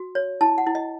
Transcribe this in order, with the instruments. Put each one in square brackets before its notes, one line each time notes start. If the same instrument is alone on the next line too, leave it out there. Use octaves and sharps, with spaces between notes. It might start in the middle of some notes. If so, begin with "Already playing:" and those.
Already playing: [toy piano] F#4
C#5
E4 A5
F#5
E4
D#5